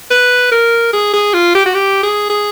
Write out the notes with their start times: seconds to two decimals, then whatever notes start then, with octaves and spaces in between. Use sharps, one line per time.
0.11 B4
0.52 A#4
0.93 G#4
1.13 G#4
1.34 F4
1.55 G4
1.66 F#4
1.74 G4
2.03 G#4
2.30 G#4